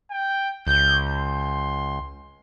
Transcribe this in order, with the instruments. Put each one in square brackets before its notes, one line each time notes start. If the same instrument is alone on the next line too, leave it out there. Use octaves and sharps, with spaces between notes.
[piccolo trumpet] G5
[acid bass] C#2 [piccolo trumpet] G6
[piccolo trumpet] C6